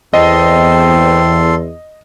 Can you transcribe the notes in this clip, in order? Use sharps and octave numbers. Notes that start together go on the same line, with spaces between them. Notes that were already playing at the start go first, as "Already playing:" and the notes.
E2 C4 A4 D#5 C6